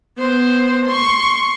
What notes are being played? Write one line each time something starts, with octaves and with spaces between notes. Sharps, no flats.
B3 C5
C6 C#6